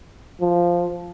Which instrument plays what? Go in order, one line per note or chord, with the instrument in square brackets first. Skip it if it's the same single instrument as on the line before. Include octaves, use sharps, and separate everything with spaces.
[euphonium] F3